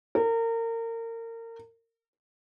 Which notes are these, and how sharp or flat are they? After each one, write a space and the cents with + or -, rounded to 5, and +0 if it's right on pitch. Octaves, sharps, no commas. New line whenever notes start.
A#4 -30